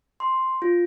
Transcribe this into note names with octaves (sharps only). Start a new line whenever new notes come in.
C6
F4